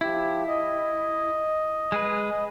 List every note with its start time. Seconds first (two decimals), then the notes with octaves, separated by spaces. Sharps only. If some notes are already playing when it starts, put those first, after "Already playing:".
0.01 F3 E4 G4
0.48 D#5
1.92 G#3 G#4 B4